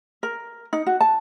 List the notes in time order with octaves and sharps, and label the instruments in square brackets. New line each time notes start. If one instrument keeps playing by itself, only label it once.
[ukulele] A#4
D#4
F#4
A5